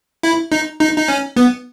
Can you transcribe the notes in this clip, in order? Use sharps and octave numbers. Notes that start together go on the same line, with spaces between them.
E4
D#4
D#4
D#4
C#4
B3